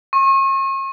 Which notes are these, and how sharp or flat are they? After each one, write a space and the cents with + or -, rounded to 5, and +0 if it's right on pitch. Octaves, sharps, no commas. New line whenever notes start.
C#6 -40